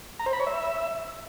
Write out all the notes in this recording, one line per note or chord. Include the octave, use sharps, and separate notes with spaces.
A#5
C5
B5
C#5
E5